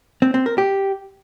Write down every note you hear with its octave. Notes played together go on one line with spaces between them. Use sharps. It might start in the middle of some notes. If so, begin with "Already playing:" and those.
C4
C4
A#4
G4